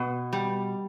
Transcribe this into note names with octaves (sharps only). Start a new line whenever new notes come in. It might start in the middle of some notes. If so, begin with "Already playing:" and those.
Already playing: B2 B3
G3